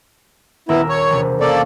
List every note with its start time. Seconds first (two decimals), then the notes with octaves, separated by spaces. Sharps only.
0.69 D#1 B3 E4 A#4 E6
0.89 C#5
1.10 E1 C3
1.41 A#3 C#4 A4 D5